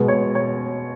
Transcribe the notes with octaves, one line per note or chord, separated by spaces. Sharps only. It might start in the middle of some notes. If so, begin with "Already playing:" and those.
Already playing: B2 G#3
C#5
C#5